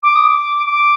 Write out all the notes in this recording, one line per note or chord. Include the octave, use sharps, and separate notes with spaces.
D6
D#6
D6
D6